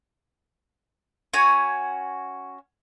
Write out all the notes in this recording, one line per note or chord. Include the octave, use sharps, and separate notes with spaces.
C#4 F#4 G#5